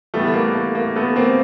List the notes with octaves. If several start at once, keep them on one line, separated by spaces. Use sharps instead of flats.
A2 E3 G3 A3 B3
A#3
A3
A#3
A3 B3
A#3 C4